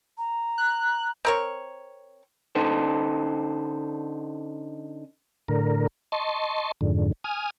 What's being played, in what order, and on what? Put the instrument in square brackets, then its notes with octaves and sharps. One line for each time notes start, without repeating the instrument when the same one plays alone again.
[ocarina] A#5
[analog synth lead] F#6
[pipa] C4 A#4 C#5
[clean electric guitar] D3 C#4 D#4 A4 C5
[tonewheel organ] A2 D3 A#4
D#5 A5 C6 C#6
F2 G#2 D3
G#5 D#6 F6